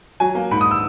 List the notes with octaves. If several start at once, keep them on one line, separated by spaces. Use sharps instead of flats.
F#3 G#5
A#3
G#2 B5
D#6
E6